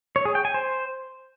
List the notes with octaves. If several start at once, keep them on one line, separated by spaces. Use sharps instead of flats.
C#5
G#4
G5
G#5
C5